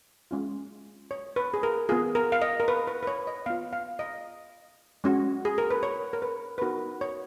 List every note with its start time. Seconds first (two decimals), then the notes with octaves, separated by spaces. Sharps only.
0.31 G#3 C#4 F4
1.11 C#5
1.36 B4
1.54 G#4
1.63 A#4
1.89 B3 F4 G#4
2.15 A#4
2.32 F5
2.42 D#5
2.60 A#4
2.68 B4
2.88 B4
3.03 B4
3.07 C#5
3.27 D#5
3.46 B3 F4 F5
3.73 F5
3.99 D#5
5.04 G#3 C#4 F#4
5.45 G#4
5.58 A#4
5.71 B4
5.83 C#5
6.13 A#4
6.22 B4
6.58 B4
6.62 B3 D#4 F#4 A#4
7.01 C#5